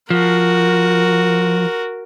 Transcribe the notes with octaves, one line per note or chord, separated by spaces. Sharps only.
F3 F#4 A#4